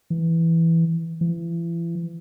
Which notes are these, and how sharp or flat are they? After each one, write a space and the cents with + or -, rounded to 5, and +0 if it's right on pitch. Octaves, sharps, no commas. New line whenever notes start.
E3 +0
E3 +35